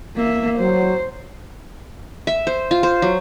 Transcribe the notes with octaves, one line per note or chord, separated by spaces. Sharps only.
A#3 E5
F#3 C5
E5
C5
F4
C5
F#3